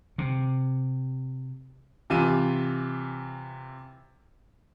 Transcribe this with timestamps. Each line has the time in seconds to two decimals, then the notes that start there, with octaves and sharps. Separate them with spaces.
0.18 C3
2.10 C3 E3 F4 G#5 D#7